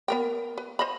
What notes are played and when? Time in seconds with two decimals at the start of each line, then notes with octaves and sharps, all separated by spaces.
0.08 B3 A#4 G5
0.58 B4
0.79 C5 D#5 B5